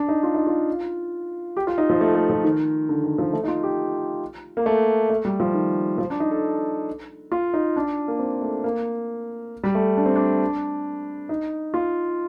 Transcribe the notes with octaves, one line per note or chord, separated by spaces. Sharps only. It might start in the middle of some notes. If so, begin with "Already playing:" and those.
Already playing: D4
D#4
F4
D#4
F4
G4
F4
D#4
F3
A3
A3
F3
D#3
D3
D#3
F3
A3
D#4
F4
G4
A#3
A3
A3
G3
F3
D#3
F3
D4
D#4
A4
F4
D#4
D4
A#3
C4
A3
A#3
G3
A3
D4
C4
D4
D#4
F4